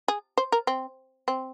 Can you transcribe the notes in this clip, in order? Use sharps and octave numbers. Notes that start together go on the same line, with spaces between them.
G#4
C5
A#4
C4
C4